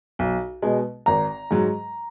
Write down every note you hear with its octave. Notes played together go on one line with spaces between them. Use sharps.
B1
B2 G#3
G#1 A#5
G#2 F#3